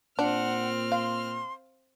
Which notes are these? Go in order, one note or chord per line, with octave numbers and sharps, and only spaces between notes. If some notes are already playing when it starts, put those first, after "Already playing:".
A#2 C4 D4 F#5 F6
F5 C6